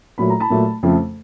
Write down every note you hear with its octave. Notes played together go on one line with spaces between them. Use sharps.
A#2 F#3 A3 B5
A#5
A5 B5
A#2 F#3 A3
F2 C#3 F3 A3